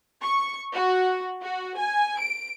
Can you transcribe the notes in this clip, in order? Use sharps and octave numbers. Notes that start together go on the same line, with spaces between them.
C#6
F#4
F#4
G#5
D7